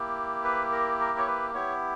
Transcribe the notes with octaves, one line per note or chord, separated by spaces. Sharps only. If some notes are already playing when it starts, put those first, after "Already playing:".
Already playing: A#3 E4 G4
B4
A#4
A#4
C#5
B4
B3 E4 G4 C#5